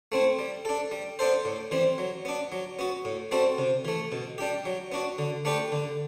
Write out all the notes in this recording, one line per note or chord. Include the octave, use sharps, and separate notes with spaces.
A3 C4 E4
G3
D4 A4
G3
B3 D4 A4 C5
A2
E3 G3 C4
F#3
B3 D4
F#3
B3 F#4
A2
G3 C4 F#4 A4
C3
E3 A3
B2
G3 D4 G4
F#3
B3 D4 F#4
D3
A3 D4 G4 B4
D3